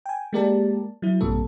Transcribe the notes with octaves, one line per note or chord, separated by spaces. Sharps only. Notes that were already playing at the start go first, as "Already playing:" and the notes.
G5 G#5
G#3 A#3 G4 A#4 D5 A5
F#3 E4
A#1 G2 C3 A#3 A4